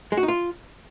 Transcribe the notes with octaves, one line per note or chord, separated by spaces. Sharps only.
G#3
F#4
D#4
F4